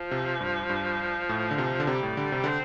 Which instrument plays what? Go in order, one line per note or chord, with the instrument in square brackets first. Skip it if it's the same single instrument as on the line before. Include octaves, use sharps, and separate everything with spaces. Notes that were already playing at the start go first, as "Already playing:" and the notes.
Already playing: [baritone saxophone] F3
[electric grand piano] C3
G2
G2
A2
D3
C3
D3
[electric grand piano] C3 [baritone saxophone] G3
[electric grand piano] A2
D3
C3
[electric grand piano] D3 [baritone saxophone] C4